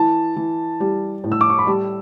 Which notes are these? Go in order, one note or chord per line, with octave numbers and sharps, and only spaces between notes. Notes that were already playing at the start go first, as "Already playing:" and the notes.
Already playing: E3 A5
E3
G3
A2
E6
D6
C#6
B5
G3 A5